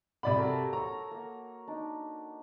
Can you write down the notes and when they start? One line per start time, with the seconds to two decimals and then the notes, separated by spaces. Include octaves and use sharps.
0.23 C3 D5 F#5 B5
0.36 F#4 A4 A#4
0.73 C#5 A#5
1.11 A#3
1.67 D4 D#4